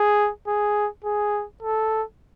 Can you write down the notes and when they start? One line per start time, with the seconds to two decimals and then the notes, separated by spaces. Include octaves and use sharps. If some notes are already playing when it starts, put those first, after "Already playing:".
Already playing: G#4
0.48 G#4
1.04 G#4
1.62 A4